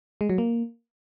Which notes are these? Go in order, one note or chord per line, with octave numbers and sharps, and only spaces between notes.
G#3
F#3
A#3